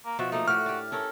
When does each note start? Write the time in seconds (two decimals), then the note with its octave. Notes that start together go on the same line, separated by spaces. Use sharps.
0.05 A#3
0.19 B2 F3 F#4 E5
0.32 A3 A#3 D#4
0.48 A2 F#4 G4 F6
0.66 D4 G4
0.92 C#4 A4 A#4